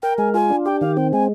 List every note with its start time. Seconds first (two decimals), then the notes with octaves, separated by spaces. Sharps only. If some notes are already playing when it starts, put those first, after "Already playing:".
0.03 A#4 G5
0.18 G#3 G#5
0.34 F4 G#5
0.50 D4
0.66 G4 G5
0.81 D#3 F5
0.96 C4 G5
1.13 G#3 G#5